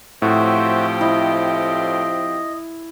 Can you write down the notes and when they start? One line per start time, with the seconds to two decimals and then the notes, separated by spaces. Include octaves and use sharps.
0.22 A2 F3 C4 F#4 G4 C5 E5
1.01 E4 D#5